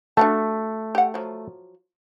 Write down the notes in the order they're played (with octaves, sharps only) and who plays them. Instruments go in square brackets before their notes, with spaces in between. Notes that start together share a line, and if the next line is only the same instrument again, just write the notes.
[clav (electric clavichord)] A3 [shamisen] D4 F#4 A5
[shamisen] G4 F#5
F3 F#3